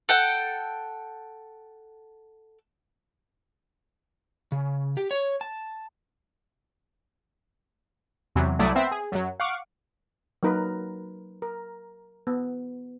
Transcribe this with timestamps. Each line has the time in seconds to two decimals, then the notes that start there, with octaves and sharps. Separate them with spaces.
0.09 A4 F#5 G5
4.52 C#3
4.97 G4
5.11 C#5
5.41 A5
8.36 E2 C3 E3 F#3
8.59 C2 F#3 A3 E4 D5 D#6
8.75 B3 C4 C5 E5
8.91 G#4
9.12 F#2 F#3
9.40 F5 F#5 C#6 D6
10.43 F#3 A#3 D#4 A#4 B4
11.42 A#4
12.27 B3